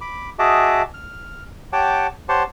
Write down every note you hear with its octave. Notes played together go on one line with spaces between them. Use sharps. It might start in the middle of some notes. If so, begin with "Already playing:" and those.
B5 D6
F#4 G#4 D#5 E5 A5 D6
F6
G4 C#5 F#5 G5 A5 D6
G4 C5 C#5 F#5 A5 C6